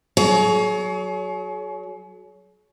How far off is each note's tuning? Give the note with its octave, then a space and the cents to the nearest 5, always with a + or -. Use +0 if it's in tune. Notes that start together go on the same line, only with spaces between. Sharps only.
F#3 +0 G#4 +40 C#5 +30